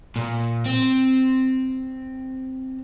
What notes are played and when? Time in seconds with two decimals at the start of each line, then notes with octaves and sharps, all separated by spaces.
0.16 A#2
0.66 C4